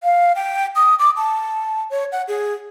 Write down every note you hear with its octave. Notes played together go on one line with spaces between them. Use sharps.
F5
G5
D#6
D6
A5
C#5
F#5
G#4